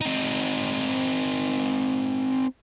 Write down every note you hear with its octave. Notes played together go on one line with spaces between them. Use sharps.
C4 D#4